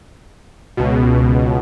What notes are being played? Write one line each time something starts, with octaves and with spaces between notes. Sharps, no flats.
C#2 B2